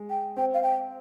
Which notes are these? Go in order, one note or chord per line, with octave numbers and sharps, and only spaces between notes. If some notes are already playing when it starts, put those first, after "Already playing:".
Already playing: G#3
G5
C4 G5
F5
G5